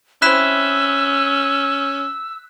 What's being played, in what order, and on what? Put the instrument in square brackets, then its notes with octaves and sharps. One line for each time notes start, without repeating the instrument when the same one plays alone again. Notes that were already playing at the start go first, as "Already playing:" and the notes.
[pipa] C4 E4 [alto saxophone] C#4 [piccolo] E6 [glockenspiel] F#6 B6 E7